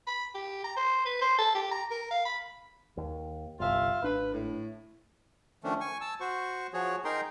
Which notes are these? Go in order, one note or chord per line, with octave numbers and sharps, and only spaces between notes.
B5
G4
A#5
C5
B4
C5
A4
G4
A#5
A#4
F5
B5
D#2
G1 C2 F4 E5 F5
G#1 D4 B4
A2
D#3 F3 A3 C#4 D4
G#5 C#6
A5 E6
F#4 C5 C#6
F3 F#4 G#4 C#5
D#4 G#4 A#4 G5 A#5 C6